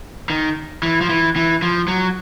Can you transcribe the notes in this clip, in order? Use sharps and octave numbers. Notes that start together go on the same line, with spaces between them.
D#3
E3
F3
E3
E3
F3
F#3